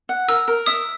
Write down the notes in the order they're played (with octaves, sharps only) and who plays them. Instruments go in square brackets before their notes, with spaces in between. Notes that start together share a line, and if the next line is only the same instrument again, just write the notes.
[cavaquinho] F#5
[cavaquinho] A#4 [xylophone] E6
[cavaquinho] A#4
[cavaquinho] E5 [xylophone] D#6